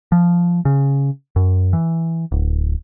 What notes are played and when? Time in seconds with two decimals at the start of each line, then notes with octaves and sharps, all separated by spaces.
0.12 F3
0.65 C#3
1.36 F#2
1.73 E3
2.32 D1